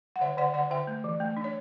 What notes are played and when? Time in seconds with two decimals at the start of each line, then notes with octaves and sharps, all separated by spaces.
0.16 F#5
0.21 D3 C#5 E5
0.37 D3 D5 F#5
0.54 D3 D5 F#5
0.71 D3 E5 G5
0.87 A3
1.04 E3
1.20 A3
1.37 D4
1.44 C#5